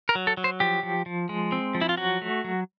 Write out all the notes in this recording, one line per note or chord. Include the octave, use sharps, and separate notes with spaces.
A#4
F#3
A4
F#3
C5
F3 G4
F3
F3
G#3
C4
F3
E4
F4
F#3 F#4
A3
F#3